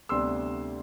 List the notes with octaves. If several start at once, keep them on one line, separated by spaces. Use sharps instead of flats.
D2 C3 G3 B3 D4 C6 E6